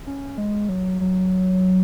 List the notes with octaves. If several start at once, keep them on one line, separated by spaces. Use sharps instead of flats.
C#4
G#3
F#3
F#3